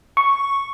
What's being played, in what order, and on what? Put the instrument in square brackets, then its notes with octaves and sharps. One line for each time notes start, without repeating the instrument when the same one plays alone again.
[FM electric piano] C#6